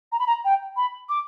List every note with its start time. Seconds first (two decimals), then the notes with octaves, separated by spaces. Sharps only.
0.12 A#5
0.19 B5
0.27 A#5
0.45 G5
0.76 B5
1.09 D6